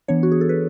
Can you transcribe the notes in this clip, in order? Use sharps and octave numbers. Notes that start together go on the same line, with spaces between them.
E3 B3 D4 C#5
F#4
G#4
A4
B4